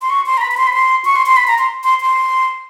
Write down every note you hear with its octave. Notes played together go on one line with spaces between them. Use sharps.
C6
C#6
C6
A#5
B5
B5
C6
B5
C6
C#6
C6
C6
B5
A#5
C6
C6
C6